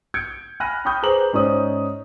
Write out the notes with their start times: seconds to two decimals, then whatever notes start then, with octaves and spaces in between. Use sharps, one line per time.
0.14 G6 G#6 C#7 D7
0.60 G#5 B5 F6 F#6 A#6 D#7
0.85 G5 B5 C#6 D#6 F6 G6
1.03 G#4 B4 C5 A#5 D6 F#7
1.33 G#2 C#4 D#4 C5 D5 D#6